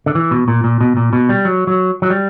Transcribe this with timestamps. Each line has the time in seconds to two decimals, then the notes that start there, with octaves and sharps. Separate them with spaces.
0.06 D3
0.15 E3
0.31 B2
0.48 A#2
0.64 A#2
0.80 B2
0.97 A#2
1.13 B2
1.29 G3
1.45 F#3
1.67 F#3
2.02 F#3
2.10 G3